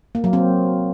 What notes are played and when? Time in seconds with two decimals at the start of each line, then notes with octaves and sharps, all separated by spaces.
0.15 A#3
0.24 F#3
0.33 C4